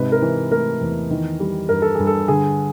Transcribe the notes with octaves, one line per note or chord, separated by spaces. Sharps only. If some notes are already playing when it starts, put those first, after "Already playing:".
Already playing: G#2 C3 B4
A#4
E3
A3 A#4
E2
D#3
G3
G2 A#4
A4
G2 G#4
A4
D3 G#4